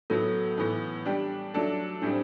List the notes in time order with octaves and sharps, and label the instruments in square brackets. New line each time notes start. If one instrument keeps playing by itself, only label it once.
[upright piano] A2 F#3 B3 [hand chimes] A4
[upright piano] A2 E3 B3
G3 D4 G4
F#3 A3 D4 A4
[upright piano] A2 G3 C4 [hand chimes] D4